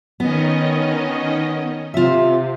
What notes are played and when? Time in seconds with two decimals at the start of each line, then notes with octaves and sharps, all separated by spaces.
0.20 D#3 B3 C#4 D#5
1.94 C3 F4 E5